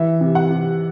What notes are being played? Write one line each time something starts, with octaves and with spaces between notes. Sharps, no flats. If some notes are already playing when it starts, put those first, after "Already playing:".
Already playing: E3 E5
C3
F#5
C3